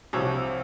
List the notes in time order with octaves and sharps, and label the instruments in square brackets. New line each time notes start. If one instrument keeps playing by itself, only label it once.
[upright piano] C2 C3 F3 C#5